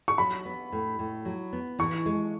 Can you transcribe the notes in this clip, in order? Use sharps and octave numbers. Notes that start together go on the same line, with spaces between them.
C#6
F#3 B5
B3
A2
A2
F#3
B3
E3 C#6
G#3